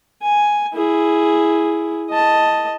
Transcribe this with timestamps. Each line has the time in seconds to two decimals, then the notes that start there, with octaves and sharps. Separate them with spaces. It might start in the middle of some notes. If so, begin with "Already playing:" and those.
0.22 G#5
0.74 E4 G#4
2.10 D#5 A5